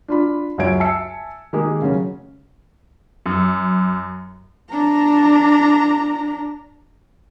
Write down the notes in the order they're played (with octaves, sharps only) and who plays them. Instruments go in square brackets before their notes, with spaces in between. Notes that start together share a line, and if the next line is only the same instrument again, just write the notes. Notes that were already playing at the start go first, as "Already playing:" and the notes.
[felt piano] D4 F4 B5
C#2 F#2 F#3 C#5 G#6 D7
E5 G#5 A5 E6 C#7
D#3 G#3 A#3 G4 G#4
C#3 F#3 C#4
[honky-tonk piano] F#2
[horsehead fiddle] D4 A#5